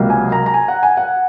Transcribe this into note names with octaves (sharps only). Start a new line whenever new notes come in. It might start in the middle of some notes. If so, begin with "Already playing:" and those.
Already playing: C#2 C3 F#3 A#3
G#5
A#5
A#5
G#5
F#5
G#5
F#5